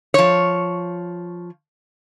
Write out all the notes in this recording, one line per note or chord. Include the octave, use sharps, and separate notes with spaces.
F3 C#5